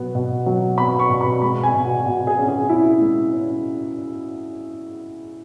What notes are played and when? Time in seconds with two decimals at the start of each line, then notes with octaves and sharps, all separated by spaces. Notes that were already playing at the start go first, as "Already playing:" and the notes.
Already playing: B2 F#3 B3
0.15 B2
0.46 F#3
0.78 B3 B5
0.99 C#6
1.10 B2
1.21 B5
1.42 G#3 B5
1.63 G#5
1.74 B2
1.85 F#4
2.06 B2 F#4
2.27 G#4
2.38 C#4
2.48 G#4
2.69 C#4 E4
3.01 G#3
3.33 C#4